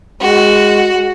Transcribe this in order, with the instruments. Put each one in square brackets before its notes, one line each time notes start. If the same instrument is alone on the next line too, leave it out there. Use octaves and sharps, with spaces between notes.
[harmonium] G#3 [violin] F#4